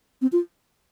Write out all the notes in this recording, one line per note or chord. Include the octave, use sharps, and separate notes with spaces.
C4
F4